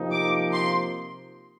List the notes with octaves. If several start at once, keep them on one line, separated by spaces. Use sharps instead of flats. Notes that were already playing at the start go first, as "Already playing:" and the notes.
Already playing: C3 F3 A#3 D#4 G4
D6
C6